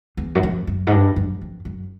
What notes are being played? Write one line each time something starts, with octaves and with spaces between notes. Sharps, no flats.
E2
F#2
F2
F#2
G#2
G2
F#2
F2
F#2